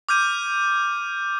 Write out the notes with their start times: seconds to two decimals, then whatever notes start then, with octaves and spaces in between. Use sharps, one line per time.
0.09 D6 F6 G6 D#7